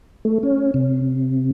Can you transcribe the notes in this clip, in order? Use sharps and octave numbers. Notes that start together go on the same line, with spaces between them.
A3
C#4
C3